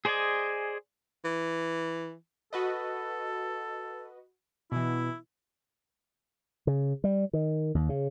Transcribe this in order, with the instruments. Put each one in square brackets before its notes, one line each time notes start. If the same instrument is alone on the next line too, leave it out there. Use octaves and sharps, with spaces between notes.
[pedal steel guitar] G#4 C5 D5 D#5 G#5
[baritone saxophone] E3
[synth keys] F#4 B4 D#5 [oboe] A4
[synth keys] B2 E3 [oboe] E4
[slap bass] C#3
G3
D#3
D#2
C#3